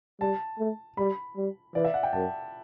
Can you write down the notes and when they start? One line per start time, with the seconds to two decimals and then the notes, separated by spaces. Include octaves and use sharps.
0.21 G3 A5
0.59 A3
0.97 G3 B5
1.36 G3
1.75 E3 D5
1.84 E5
1.94 F#5
2.03 G5
2.13 F#2 A5